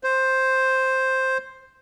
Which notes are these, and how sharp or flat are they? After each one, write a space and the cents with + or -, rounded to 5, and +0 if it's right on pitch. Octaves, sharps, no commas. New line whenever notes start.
C5 +5